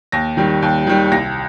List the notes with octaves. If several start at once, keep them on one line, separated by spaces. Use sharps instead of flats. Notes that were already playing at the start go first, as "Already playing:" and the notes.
D#2 A#6
D#3 G3
D#2
D#3 G3
C2 A#6